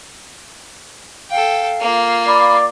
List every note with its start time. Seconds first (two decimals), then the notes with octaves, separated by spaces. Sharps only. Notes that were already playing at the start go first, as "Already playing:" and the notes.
1.30 A4 F5 G5
1.81 A#3 F4
2.27 D5 B5